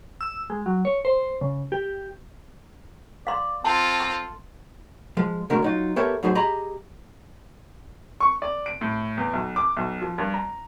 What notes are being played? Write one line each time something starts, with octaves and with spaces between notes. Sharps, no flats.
E6
G#3
F#3
C#5
C5
C#3
G4
D5 F5 C6
C4 F4 A4 A5
C6
F3 G#3
B2 D3 G#3 A3 D4 A#4
F#3 D#4 F4
B3 G4 A4 A#4 C#5 E5
A2 F#3 D#4 G#4 C5
G4 G#4 D#5 A#5 B5
C#6
D5
D7
A2
E2
B1
D6
B1
F3
G2
A#5